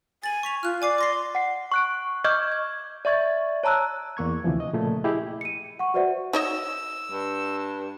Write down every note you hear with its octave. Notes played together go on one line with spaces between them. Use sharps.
G#5 A6 F#7
C#6 B6 F7
F4 F6 F#6
D5 G#5 D6 C7
C6 D6 A#6 C7
F#5 C7
C#6 F#6 D7
D#5 C#6 D6 F6 G6 G#6
G#6
D5 E5 C#6 G#6 A6
C#5 A5 A#5 E6 F#6
E2 A#3 C#6 G#6
D2 C3 E3 F3
D#5
A#2 C#3 F3 A3
E4 G4 G#4 D#5
C#7 D#7
F#5 C#6
F#4 B4 C5 D5 E5 F#5
D#4 C#5 D#5 E6
G2